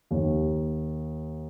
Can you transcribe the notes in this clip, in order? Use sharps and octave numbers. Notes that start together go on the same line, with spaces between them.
D#2